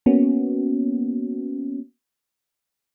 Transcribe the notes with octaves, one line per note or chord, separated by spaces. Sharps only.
A#3 B3 C#4 F#4